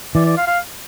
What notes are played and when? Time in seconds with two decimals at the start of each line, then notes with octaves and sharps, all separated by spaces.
0.15 E3 D5
0.26 D5
0.37 F5
0.47 F5